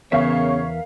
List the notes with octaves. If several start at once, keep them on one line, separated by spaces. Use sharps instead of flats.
E2 C#3 E3 B3 A#4 C#5 E5 F5